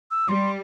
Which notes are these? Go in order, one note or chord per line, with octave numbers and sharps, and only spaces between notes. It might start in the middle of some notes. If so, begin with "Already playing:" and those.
E6
G3 C6